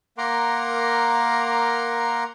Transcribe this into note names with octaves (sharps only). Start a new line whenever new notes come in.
A#3 A#4 F#5 A#5 C6 D6